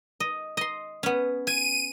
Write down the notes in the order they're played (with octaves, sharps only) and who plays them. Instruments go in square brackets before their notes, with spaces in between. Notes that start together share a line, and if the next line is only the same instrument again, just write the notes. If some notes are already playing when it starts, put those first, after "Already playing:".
[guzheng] D#5
D#5 C6
B3 C#4
[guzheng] G#5 [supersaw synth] D#7